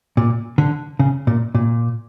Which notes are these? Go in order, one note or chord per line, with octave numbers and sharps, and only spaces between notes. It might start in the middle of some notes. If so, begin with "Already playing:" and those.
A#2
D3
C#3
A#2
A#2